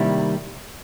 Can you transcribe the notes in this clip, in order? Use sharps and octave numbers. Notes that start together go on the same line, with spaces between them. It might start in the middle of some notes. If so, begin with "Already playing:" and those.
Already playing: C3 D#3 G3 A#3 E4